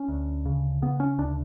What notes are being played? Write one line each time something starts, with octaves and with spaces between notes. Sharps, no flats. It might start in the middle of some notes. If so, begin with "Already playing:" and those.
Already playing: C#4
D2
C#3
C#3 B3
C#4
D2 D4